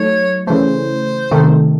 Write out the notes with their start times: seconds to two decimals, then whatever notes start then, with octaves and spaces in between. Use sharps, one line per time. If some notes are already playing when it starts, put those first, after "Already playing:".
Already playing: F#3 A3 D#4 C#5
0.47 C#3 E3 A3 C5
1.31 C3 D#3 A3